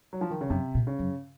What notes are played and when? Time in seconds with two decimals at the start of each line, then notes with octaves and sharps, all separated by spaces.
0.13 F#3
0.21 F3
0.31 D#3
0.41 C#3
0.50 F#2 C3
0.75 A#2
0.87 C#3
0.99 F#2